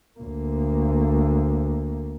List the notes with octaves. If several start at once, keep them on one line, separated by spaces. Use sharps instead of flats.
D2 A#3